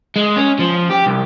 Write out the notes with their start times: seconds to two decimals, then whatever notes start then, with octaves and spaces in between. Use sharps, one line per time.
0.16 G#3
0.36 C#4
0.59 F3
0.90 G4
1.06 C2